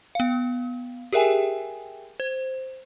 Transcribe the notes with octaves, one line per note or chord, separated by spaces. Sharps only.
B3 F5
G4 G#4 A#4 E5 G5 G#5
C5